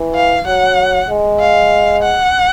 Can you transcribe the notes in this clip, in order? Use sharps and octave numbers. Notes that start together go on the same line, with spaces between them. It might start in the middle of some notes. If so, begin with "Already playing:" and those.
Already playing: E3
F5
F#3 F#5
G#3
F5
F#5